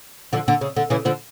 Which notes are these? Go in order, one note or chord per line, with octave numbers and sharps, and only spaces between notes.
D3 F3
D3
C#3
D3
C#3 E3
D3 F3